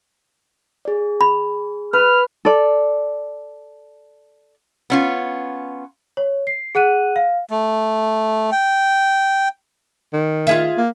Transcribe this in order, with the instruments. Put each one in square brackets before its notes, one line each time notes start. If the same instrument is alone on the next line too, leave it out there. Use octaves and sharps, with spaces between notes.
[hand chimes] G#4 D5
[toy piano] B5
[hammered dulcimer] B4 [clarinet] F6
[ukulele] A4 D5
[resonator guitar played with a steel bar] B3 C#4 F4
[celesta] C#5
C7
G#4 F#5 F#6 D#7
F5
[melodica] A3
G5
[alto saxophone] D#3
[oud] F4 G#4 E5
[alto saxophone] A#3